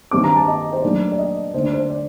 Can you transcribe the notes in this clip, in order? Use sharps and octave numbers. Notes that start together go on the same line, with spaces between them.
G2 D#3 G3 C4 D6
A#5
A5
D#5
C5
A#2 F#3 A3 D4 D5
D5
D#5
D3 A3 D4 C5
D5
C5
D5